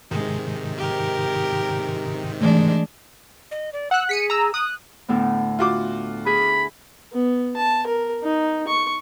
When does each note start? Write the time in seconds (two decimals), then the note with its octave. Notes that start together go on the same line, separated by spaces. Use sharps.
0.11 G#2 C3 D#3 G#3
0.78 G4 A#4
2.41 E3 G#3 A3 D4
3.51 D#5
3.73 D5
3.91 F#5 E6 F#6
4.09 G#4 B6 C#7 D#7
4.30 A#5 E6
4.54 D#6 F#6
5.09 D2 A2 B3
5.59 F4 F#4 D6
6.26 G#4 B5
7.13 B3
7.56 A5
7.86 A#4
8.23 D#4
8.68 C#6